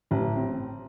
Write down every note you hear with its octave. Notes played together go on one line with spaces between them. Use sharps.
A1
C4